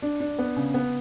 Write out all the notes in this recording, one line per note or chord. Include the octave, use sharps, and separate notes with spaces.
D4
D4
B3
C#3
B3